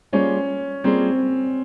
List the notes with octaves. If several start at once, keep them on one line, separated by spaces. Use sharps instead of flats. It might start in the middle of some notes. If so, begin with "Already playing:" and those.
G3 A#3 C#4 F4 G#4 C5
G3 A#3 C4 F4 G#4 C5